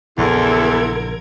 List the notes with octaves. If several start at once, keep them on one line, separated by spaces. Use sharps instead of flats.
A#1 E2 C#3 E4 A4 A#4 C6 G#6